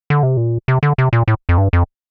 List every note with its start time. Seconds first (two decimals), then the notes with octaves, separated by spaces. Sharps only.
0.10 D3
0.23 C3
0.37 A#2
0.68 C3
0.83 D3
0.98 C3
1.13 A#2
1.28 A2
1.49 F2
1.58 G2
1.73 F2